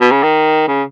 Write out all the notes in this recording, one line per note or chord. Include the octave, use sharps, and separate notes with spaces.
B2
C#3
D#3
C#3